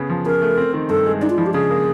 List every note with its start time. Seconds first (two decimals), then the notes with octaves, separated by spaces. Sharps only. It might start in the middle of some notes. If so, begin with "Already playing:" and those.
Already playing: C#3 B3
0.09 F3
0.26 C#3 A#4
0.42 A3
0.57 C4
0.74 D#3
0.89 G2 A4
1.06 G#3
1.22 D4 D#4
1.30 F4
1.38 F3 E4
1.46 G4
1.54 C#3 G#4
1.70 A#3